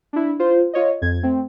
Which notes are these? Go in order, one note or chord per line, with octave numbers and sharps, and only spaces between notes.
D4 E4
F4 C5
F4 C#5 D#5
F2 G#6
A3 C4